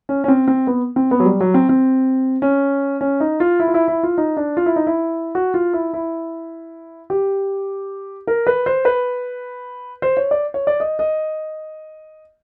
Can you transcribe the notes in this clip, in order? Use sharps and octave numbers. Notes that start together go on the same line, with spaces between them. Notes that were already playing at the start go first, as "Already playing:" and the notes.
C#4
C#4
C4
C4
B3
C4
B3
F#3
G3
F#3
C4
C4
C#4
C#4
D#4
F4
E4
F4
E4
E4
F4
D#4
D4
F4
E4
D#4
E4
F#4
F4
E4
E4
G4
A#4
B4
C5
B4
C5
C#5
D5
C#5
D5
D#5
D#5